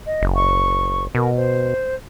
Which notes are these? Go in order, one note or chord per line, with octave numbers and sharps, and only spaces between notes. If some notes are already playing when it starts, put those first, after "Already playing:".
D#5
F#1
C#6
B2 A#4
C5